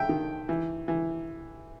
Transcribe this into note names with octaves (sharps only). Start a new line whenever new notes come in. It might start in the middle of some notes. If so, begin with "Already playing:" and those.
Already playing: E5 G5
D#3
E3
E3